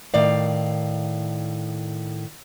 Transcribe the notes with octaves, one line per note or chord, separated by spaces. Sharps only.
A2 D#3 D5 F5